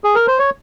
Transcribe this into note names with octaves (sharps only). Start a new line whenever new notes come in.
G#4
A#4
C5
C#5